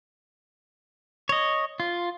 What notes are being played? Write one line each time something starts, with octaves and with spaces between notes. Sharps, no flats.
C#5 D#5
F4